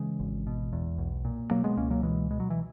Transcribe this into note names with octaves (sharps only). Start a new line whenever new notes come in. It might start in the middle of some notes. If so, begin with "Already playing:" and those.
Already playing: C#3 E3 G#3
G#1
B2
E2
B1
A#2
B2 F#3 A#3
G#3 B3
C#2 A#3 C#4
F#3 A#3
B2 E3 G#3
B2 G#3
F#3
E3